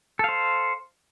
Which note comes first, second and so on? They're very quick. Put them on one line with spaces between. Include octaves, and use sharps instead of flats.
A4 F5 C5